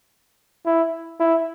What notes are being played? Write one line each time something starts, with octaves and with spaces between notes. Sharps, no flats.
E4
E4